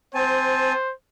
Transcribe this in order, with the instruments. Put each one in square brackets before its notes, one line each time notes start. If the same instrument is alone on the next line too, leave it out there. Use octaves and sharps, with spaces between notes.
[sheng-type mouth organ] C4 G#5 A5 [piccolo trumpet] C5